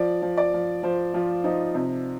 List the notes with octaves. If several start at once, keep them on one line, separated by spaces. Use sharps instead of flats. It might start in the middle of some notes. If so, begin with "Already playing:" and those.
Already playing: F3 D5
F3
D5
F3
F3 C5
F3 F4
F3 D#4
C3